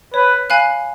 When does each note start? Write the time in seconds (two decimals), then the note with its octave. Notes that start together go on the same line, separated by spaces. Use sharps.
0.14 B4 C#5
0.50 F5 G#5 B5 F#6